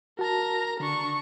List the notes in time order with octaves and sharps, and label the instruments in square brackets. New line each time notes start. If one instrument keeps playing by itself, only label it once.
[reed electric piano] F#4 A5 [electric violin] A#4 A#5
[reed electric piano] D3 [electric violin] D4 C#6